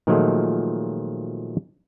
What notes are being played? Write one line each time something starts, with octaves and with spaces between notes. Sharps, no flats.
A#2 D#3 F3 F#3 G#3 A3